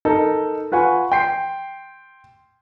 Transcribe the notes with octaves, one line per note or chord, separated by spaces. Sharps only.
D#4 A4 A#4
F4 B4 F#5 G#5 C#6
G5 C6 C7